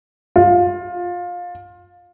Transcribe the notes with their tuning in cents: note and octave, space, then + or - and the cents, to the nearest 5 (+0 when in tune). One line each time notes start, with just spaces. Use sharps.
F4 +20